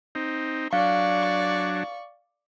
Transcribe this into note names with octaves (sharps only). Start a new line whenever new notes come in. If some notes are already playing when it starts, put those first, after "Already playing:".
C4 D#4
F#3 D4 D5 F5 C#6